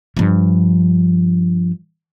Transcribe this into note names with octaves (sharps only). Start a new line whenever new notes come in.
G2 F3